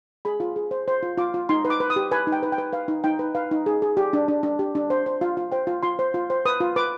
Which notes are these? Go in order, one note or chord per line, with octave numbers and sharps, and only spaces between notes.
G#4 B5
F4
G#4
C5
C5
F4
F4 D6
F4
D#4 C6
B4
D6
B4
D#6
G4
B4 G#5
D#4
G5
B4
G5
B4
B4 F5
D#4
D#4 G5
B4
B4 F5
D#4
G#4
G#4
G4
D4
D4
D4
G4
D4
C5
C5
F4 F5
F4
C5 G5
F4
F4 C6
C5
F4
C5
B4 D#6
F4
B4 D6